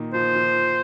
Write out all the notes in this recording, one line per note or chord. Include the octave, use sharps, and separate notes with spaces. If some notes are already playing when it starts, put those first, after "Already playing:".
Already playing: A#2 D#3 A#3
F3 C5
F3